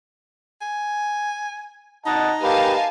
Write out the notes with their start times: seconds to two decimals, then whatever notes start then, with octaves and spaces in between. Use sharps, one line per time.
0.62 G#5
2.06 D#4 D#5 F#5 A5
2.42 A#3 G4 B4 F5 G#5 A5